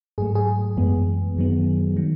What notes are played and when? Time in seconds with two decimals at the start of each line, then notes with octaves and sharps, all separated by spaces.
0.18 G#2 F#3 A3 G#4
0.35 G#4
0.77 F#2 E3 G#3 B3
1.37 F#2 D#3 F#3 B3
1.96 D#3 F#3